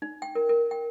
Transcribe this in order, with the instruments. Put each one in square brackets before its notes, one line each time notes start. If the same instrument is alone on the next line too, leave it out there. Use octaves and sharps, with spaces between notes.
[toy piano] D#4
G5
A#4
A#4
G5